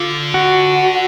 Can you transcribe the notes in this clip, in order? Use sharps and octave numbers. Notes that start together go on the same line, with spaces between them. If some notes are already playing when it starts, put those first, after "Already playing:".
Already playing: D3 F4
F#4